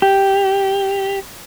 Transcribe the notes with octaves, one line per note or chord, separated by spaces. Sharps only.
G4